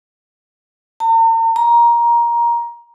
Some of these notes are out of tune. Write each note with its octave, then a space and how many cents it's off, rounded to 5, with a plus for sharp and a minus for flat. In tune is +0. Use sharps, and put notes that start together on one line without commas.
A#5 -45
A#5 +15